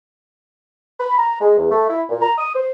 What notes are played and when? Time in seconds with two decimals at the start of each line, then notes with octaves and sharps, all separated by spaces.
0.99 B5
1.18 A#5
1.41 G#3
1.57 E2
1.71 A3
1.88 E4
2.09 A#2
2.21 A#5
2.38 D#6
2.54 C5